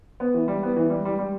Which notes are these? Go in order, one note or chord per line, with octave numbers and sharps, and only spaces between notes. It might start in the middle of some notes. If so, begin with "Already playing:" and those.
B3
E3
G3
B3
E3
G3
G3
G3